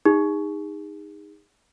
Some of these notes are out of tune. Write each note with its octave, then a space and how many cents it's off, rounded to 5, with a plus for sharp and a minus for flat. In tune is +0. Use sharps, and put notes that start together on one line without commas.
D#4 +0 G#4 -40